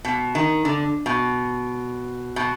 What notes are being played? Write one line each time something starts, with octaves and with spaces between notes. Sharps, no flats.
B2
D#3
D3
B2
B2